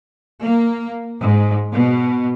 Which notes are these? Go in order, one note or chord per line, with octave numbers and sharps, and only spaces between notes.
A#3
G#2
B2